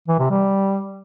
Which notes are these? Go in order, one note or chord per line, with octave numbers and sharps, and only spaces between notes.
E3
C3
G3